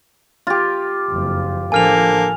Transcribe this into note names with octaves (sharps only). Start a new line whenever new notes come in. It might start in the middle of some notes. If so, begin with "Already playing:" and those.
F4 G4
F#1 F2
A1 D3 F3 A#3 A4 G#5 F6 F7